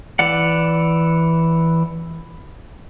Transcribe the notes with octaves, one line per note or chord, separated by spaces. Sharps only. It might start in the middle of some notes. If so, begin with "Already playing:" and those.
E3 D5 F#5